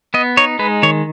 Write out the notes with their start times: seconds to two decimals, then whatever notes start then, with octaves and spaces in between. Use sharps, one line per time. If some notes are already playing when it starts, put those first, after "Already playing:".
0.14 B3 D#5
0.37 D#4 C#5
0.59 G#3 B4
0.83 D#3 C#5